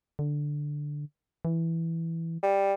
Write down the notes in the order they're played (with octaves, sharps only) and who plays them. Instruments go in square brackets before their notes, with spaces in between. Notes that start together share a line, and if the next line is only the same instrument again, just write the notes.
[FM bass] D3
E3
[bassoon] G3